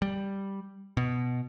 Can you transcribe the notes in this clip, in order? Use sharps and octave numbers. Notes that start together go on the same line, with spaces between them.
G3
B2